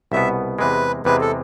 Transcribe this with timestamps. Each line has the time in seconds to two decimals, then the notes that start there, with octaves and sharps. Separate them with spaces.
0.12 C2 B2 B3 E5
0.59 E2 C3 G#3 B4
1.05 E2 C3 G#3 B4
1.21 A4